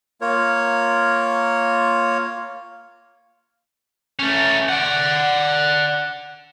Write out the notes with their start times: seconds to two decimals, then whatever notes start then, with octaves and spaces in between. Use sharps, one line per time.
0.21 A#3 F4 A#4 C#5
4.19 A3 C#4
4.69 D5 F#5